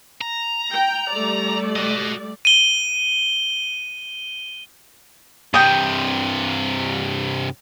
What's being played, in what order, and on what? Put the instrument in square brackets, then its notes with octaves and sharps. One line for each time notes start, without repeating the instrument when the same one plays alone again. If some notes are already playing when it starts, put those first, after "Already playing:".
[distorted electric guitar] A#5
[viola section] G5
G3 A3 D5
[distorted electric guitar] F#4 D#5
[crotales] D#7 G7
[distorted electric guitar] G2 C3 [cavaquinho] G5 D#6